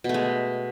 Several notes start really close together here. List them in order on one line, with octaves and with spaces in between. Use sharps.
B2 A3 G#3